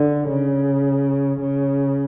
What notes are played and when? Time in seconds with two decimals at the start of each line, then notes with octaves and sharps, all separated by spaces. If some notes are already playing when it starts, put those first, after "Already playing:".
Already playing: D3
0.29 C#3
1.40 C#3